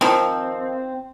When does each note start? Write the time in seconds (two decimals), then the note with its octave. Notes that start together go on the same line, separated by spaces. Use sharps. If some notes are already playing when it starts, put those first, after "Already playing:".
0.01 D#3 F3 C4